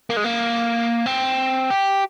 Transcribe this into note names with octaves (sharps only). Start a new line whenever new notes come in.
A#3
G#3
A#3
C4
G4